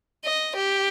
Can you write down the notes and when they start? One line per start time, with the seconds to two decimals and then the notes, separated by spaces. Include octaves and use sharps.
0.24 D#5
0.56 G4